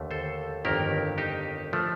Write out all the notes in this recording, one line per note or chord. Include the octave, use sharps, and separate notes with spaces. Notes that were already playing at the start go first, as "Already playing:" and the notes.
Already playing: D#2 D3 A3
A4 C5
G1 F2 D#3 A#3 G4 A#4
D#4 G4
F3 A3